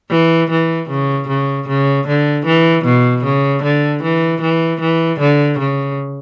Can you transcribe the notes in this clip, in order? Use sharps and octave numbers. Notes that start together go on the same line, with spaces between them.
E3
E3
C#3
C#3
C#3
D3
E3
B2
C#3
D3
E3
E3
E3
D3
C#3